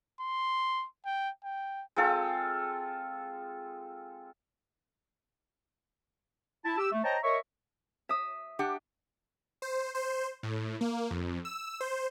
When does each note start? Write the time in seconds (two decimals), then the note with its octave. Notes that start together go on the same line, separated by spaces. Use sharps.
0.20 C6
1.06 G5
1.44 G5
1.96 G#3 C4 F4 A4
6.65 E4 A5
6.78 G4 E6
6.92 A3
7.04 C5 C#5 D#5 G5 A5 A#5
7.23 A#4 C#5 D#5 E5 C#6
8.09 E5 D#6
8.59 D4 G4 F#5
9.62 C5
9.95 C5
10.43 A2
10.81 A#3
11.11 F2
11.45 E6
11.81 C5